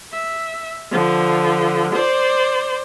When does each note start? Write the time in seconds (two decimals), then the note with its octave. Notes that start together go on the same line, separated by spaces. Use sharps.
0.13 E5
0.91 D3 F3
1.95 C5 D5